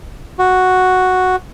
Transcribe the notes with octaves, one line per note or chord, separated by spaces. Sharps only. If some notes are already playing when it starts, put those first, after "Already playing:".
F#4